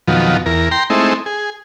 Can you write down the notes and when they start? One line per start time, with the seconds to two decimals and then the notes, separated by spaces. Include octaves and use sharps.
0.08 F2 B2 D#3 F3 F#3
0.46 E2 A#4
0.71 G5 A#5 C6
0.90 G#3 A3 C4 D#4 E4
1.26 G#4